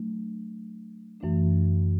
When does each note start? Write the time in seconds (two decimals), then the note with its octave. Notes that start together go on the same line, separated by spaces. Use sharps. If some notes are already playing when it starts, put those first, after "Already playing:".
Already playing: F#3 A3 D4
1.20 F#2 E3 A3 D4